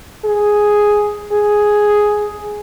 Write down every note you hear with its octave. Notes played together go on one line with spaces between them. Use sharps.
G#4
G#4